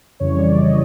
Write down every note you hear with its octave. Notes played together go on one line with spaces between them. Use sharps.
F2 C#3 E3 G3 C#5
D5
D#5